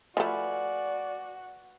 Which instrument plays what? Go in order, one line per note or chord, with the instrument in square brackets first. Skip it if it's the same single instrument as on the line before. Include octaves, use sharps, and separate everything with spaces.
[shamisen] F3 A3 [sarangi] F#4 [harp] B4 F5 G#5 [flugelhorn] D5